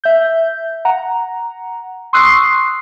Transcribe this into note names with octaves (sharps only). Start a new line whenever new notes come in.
E5 G6
F#5 A#5
C6 C#6 D#6 E6 F#6 C7